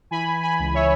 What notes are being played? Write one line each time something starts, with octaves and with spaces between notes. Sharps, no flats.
E3 G#5 B5
G#5 B5
C#2
C#5 E5